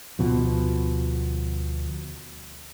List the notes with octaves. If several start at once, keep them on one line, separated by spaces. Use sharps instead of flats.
D2 B2 F3